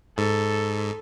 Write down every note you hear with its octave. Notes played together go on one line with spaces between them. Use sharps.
G#2 A4